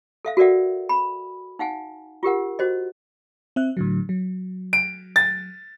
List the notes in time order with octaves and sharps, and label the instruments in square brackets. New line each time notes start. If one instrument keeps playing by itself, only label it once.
[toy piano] A4 E5 F5
F#4 A4 A#4 D5 E5 F#5
B5
D#4 F5 F#5 G#5
F4 G4 A#4 F#5
F#4 C5 D#5
[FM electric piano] C4 E5 F#6
A2 D3 F#3
F#3
[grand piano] D7
A6